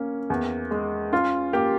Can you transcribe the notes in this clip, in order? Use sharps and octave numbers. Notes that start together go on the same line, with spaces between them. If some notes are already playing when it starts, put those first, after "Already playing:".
Already playing: A#3 C#4
E2
G#3
C#4 F4
A#3 G4